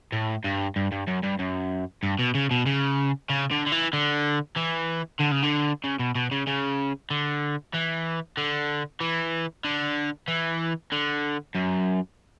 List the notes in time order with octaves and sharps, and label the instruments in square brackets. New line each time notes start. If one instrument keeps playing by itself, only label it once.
[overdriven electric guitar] A2
G2
G2
G2
F#2
G2
F#2
G2
B2
C#3
B2
C#3
C#3
D3
D3
E3
D3
E3
D3
C#3
D3
C#3
B2
B2
C#3
C#3
D3
E3
D3
E3
D3
E3
D3
F#2